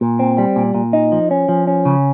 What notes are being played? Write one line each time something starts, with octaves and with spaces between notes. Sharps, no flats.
A#2
C4
G3
A#2
A#2
D#4
F3
C#4
F3
C#4
C#3